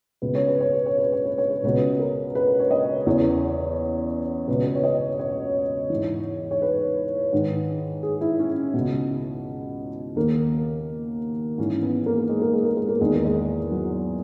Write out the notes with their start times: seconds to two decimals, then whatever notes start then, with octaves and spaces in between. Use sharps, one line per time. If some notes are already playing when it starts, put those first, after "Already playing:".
0.22 C#2 B2 B4
0.35 C#5
0.48 B4
0.60 C#5
0.74 B4
0.86 C#5
0.99 B4
1.13 C#5
1.25 B4
1.38 C#5
1.51 B4
1.64 C#2 B2 B4
1.99 A#4
2.35 B4
2.59 C#5
2.71 D#5
3.06 E2 C#3 E3 C#5
4.48 C#2 B2 B4
4.66 B4
4.75 C#5
4.84 D#5
5.19 C#5
5.90 G#2 E3
6.51 C#5
6.62 B4
7.33 G#2 D#3
8.03 G#4
8.21 E4
8.39 C#4
8.74 C#2 B2
10.16 D#2 D#3 A#3
11.58 G#2 E3 C#4
11.83 B3
12.06 A#3
12.29 G#3
12.42 A#3
12.53 G#3
12.65 A#3
12.77 G#3
12.89 A#3
13.01 E2 D#3 G#3
13.12 A#3
13.25 G#3
13.71 F#3